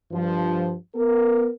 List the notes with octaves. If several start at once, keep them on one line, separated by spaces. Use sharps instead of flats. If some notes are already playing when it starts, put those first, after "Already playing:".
G2 F3
B3 A#4